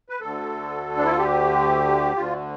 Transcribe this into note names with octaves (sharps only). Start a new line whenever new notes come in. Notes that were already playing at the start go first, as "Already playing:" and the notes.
B4
D2 D3 A4
D4
E4
F4
G4
D2 D3 F4